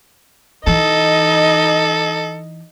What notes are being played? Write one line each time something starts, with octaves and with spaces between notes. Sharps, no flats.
E3 D#4 A4 D#5